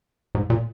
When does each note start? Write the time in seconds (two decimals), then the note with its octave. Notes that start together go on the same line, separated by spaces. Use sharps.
0.35 G#2
0.50 A#2